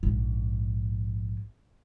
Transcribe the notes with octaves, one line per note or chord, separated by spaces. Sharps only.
A#1 G#2